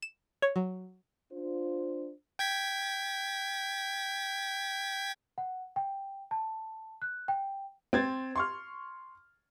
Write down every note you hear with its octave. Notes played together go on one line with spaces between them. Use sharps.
E7
C#5
F#3
D4 F4 C5
G5 G#6 B6
F#5
G5
A5
F#6
G5
C4 G#6 A6
C6 C#6 F6